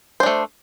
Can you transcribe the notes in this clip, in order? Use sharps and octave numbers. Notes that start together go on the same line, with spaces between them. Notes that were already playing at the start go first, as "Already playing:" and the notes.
A3 D4 C5